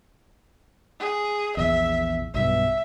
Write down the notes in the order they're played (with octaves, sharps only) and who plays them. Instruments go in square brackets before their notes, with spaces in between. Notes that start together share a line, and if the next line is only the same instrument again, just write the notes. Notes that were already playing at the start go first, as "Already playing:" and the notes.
[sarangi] G#4
[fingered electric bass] A#1 E2 [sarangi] E5
[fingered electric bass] B1 G2 B2 [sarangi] E5